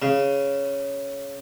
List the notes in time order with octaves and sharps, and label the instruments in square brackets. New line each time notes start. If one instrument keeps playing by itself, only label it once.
[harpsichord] C#3